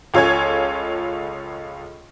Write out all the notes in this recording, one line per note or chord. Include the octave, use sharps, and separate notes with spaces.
C#2 F4 A4 C#5 G#5 G#6